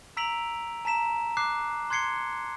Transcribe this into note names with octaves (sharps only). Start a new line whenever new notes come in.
A#5 E6 B6 D7 F7 F#7
A5 A#5 B6 E7
D6 F#6 C7
C6 F#6 G#6 C7 C#7 G7